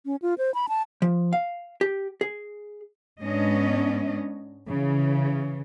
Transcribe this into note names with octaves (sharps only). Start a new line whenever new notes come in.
C#4
F4
C5
B5
A5
F3
F5
G4
G#4
G#2 G#3 B3 C#4 D4 D#5
C#3 E3